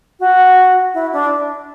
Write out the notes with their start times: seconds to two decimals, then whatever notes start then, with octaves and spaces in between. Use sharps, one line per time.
0.20 F#4
0.94 E4
1.13 D4